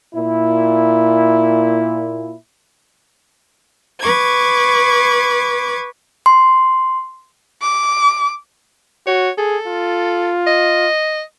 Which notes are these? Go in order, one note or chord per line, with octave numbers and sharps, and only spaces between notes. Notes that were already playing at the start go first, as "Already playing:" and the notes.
A#2 E4
B4 C#6 D6 G#6
C6
D6
F#4 C#5
G#4 A4
F4
D#5